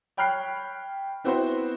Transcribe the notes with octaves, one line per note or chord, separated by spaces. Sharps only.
C#5 G5 B5 F6 F#6 C7
B3 C4 E4 F#4 B4 C5